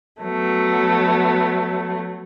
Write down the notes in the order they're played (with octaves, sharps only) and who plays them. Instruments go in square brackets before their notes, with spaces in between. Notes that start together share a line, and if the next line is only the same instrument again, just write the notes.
[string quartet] F#3 A3 B3